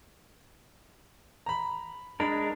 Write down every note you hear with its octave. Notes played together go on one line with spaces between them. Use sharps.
A#5 B5
G#3 D4 A#4 B5